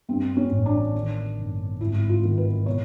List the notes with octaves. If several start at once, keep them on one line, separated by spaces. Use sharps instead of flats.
G2 C4
C#4
A1
D4
D#3
G1
G#1 E4
F4
D#3
B4
B2 C#5